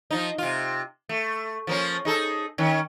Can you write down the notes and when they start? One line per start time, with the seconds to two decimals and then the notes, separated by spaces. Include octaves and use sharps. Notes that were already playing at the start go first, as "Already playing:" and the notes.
0.11 F3 D#4
0.38 C3 F4
1.09 A3
1.67 F3 A#3 C#4
2.05 D#4 G#4 A4
2.58 D#3 C#4